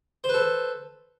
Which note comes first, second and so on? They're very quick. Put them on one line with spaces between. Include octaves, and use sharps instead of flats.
C5 B4 A4